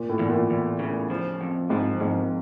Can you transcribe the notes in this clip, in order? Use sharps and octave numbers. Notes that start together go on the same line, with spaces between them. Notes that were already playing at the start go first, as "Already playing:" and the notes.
Already playing: A#2
A2
E2
A#2
E2
C#3
F3
F2
G#2 F3
F2 G#2